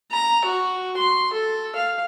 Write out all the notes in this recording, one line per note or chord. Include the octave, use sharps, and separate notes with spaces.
A#5
F#4
C6
A4
F5